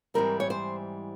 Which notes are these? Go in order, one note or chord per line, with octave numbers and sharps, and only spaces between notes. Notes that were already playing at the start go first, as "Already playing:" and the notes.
G#2 E3 G3 C4 A#4
C#5
C5